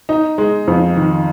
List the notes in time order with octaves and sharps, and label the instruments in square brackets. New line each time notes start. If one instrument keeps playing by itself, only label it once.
[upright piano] D#4
G#3
F2
D#3